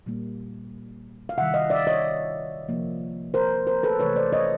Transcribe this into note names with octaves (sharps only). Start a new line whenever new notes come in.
A#2 G3 A#3
F5
C3 D#3 G3 E5 F#5
D#5 F5
D5 E5
C#5 D#5
C3 F3 A#3
A#4 C5
A#4 C5
A4 B4
C3 E3 A3 B4 C#5
C5 D5
C#5 D#5